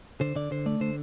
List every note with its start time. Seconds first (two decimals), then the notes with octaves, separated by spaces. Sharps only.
0.21 D3 C5
0.36 D3 D5
0.51 D3 C5
0.66 A3 D5
0.81 D3 C5